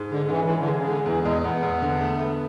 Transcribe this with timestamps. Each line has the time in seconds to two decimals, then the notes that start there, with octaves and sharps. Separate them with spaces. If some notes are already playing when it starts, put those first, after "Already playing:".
Already playing: G#2 G#3
0.12 D3 G#3
0.25 D3
0.30 E3 C#4
0.45 E3 G#3
0.59 D3
0.68 G#4
0.78 C#3
0.86 D3 G#3
1.06 E2 E3
1.24 E2 G#3
1.44 E2 B3
1.63 E2
1.82 D3
2.01 A3
2.19 A3